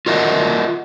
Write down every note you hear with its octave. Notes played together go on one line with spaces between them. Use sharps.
F4 F#4 A#4 D#5 E5 F#5